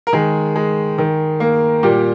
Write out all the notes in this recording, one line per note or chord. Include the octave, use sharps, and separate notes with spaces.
A#4
D#3 G#3 G#4
G#3
D#3
A#3
A#2 G3 G4